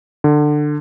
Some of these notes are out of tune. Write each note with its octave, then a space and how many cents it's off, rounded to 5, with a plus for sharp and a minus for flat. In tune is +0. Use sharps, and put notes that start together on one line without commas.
D3 +20